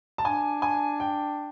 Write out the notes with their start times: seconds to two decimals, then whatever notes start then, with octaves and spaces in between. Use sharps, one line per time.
0.18 A5
0.24 D4 G#5
0.62 G#5
1.00 G5